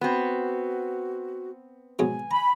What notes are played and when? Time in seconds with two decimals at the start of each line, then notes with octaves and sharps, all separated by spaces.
0.01 B3 C4 F#4
1.99 G#2 B2 F#3 G#5
2.31 A#5 B5